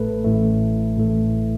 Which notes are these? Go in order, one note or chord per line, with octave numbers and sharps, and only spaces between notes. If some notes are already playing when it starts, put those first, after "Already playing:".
Already playing: A1 A2 A3 A4 B4
A1 A2 A3
A1 A2 A3